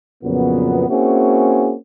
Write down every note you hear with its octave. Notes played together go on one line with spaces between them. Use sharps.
F2 A#2 C#3 F#3 B3
A#3 C4 C#4 E4 F#4 G#4